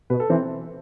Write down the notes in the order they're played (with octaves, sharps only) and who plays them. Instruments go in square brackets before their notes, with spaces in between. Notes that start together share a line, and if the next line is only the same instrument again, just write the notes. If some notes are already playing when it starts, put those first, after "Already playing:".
[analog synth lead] B2 [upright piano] B4
[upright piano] A4
[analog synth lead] E3 [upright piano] C4